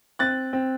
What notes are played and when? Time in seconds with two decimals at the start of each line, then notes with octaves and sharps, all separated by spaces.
0.19 C4 F#6 A6
0.53 C4